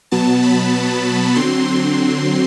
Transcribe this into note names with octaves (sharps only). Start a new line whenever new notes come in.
B2 F#3 B3 A5
B5
D3 F#3 C4 C6
C6